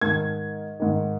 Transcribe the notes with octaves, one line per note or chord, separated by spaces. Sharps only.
G#2 D#3 G#6
G#2 D#3